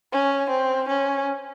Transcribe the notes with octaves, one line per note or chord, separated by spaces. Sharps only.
C#4
C4
C#4